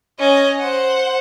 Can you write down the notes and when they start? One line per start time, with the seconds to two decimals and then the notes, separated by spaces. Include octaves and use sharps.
0.19 C#4 D#5
0.59 C5 F#5